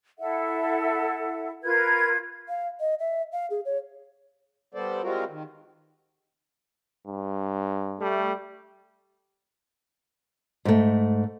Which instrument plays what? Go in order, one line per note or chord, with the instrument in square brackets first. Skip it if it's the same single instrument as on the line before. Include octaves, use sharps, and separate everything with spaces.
[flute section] E4 A4 E5 F#5
F4 A#4 B4 G#6
[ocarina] F5
D#5
E5
F5
G#4
C#5
[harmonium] G3 B3 A4 C5 D5
G3 G#3 C4 F4 F#4 A#4
D#3
[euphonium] G2
[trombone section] G3 A3
[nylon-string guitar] G#2 A3